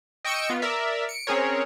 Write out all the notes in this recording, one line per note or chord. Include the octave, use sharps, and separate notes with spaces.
D#5 G5 C#6 E6 C#7 D7
B3 F4
A#4 D5 E5
C#7 D7
C4 C#4 G#4 A#4 C#5